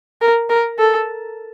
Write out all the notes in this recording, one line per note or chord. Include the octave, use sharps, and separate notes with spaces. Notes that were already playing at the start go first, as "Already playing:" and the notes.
A#4
A#4
A4